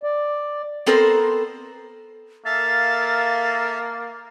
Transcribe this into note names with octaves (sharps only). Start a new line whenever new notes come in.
D5
B3 C4 A4 A#4 C5
A#3 A4 E5 F5 A6